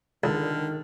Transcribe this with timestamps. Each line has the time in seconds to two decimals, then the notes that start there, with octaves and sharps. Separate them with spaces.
0.24 C#2 D3 D#3 A#4